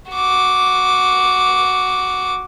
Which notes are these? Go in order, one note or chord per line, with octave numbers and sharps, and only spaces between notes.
F#4 D6